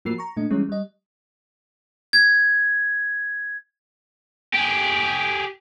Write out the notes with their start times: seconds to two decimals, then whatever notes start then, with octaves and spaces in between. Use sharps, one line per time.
0.05 A2 F3 A#3 F#4 A#4 C7
0.18 A#5 C#6
0.37 A#2 A3 D4 D#5
0.50 E3 G3 G#3 C#4 E4
0.69 G3 D#5
2.13 G#6
4.54 G4 G#4